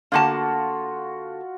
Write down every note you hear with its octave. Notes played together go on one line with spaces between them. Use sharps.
D3 A#3 F4 F#4 A5